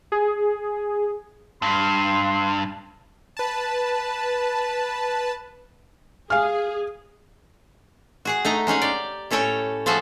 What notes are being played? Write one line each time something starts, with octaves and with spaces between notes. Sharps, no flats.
G#4
G2 C6
B4 A5
G#4 F5 G#5 F6
F#4 G#4 F#5
A3 D#4 A#5
G#3 C#4 D#4 G#4
G4 D5
A2 C#4 A4 C#5 G5
F3 A3 F#4 G#4 A4